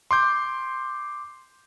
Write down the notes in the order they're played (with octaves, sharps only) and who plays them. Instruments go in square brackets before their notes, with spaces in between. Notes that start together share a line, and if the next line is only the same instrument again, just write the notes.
[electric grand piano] C6 D6 G6